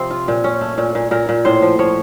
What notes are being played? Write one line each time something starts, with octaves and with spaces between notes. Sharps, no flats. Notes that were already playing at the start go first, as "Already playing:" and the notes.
Already playing: C3 F3 C4 C5
F4
A#2
C#4
A3
A#2
A#2
A#2 A#4
A#2
A2 C5
F3
F3 C#5